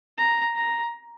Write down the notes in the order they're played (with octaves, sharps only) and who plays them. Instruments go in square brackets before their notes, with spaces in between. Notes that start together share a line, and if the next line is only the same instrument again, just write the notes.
[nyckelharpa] A#5
A#5